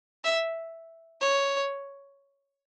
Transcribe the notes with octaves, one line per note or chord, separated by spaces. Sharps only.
E5
C#5